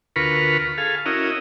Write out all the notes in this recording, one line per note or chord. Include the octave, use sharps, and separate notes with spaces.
D2 F4 A#4 B4 B5 C#6
G#4 A4 F5
C#4 E4 F#4 A#4 D#5